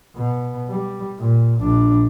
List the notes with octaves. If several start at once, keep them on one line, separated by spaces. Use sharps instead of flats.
B2
G3
A#2
A#1 D4